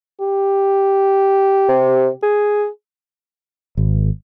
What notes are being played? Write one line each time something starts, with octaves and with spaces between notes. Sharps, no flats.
G4
C3
G#4
G#1